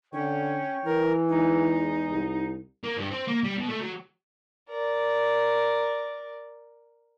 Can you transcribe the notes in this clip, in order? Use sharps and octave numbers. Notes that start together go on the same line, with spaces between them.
D3 C#4 C#5 G5 C#6
E3 A#4
E2 G#3 D#4
C2
A#3
G2
C4
A#3
G3
B2
A3
F#3
A#4 D5